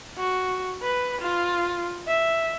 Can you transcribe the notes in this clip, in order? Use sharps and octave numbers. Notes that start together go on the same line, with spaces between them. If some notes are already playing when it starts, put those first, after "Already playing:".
F#4
B4
F4
E5